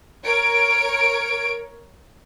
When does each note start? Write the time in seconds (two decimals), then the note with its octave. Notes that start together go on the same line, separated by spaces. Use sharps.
0.26 A#4 C#5 D7